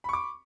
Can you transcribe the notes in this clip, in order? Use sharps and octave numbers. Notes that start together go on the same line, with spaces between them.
B5 C#6 D6